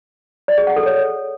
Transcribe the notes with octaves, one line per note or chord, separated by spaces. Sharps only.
D5
G#4
F#5
A4
C#5